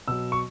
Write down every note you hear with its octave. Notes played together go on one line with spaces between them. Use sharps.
B2 F#3 E6
C#6